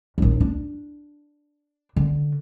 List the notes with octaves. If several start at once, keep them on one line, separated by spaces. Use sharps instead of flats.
A#1 D#2
D4
D3